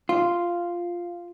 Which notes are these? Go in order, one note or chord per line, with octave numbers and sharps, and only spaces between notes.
F4